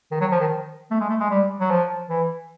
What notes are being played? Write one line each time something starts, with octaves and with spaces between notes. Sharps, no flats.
D#3
F#3
F3
D#3
A3
G#3
A3
G#3
G3
F#3
F3
E3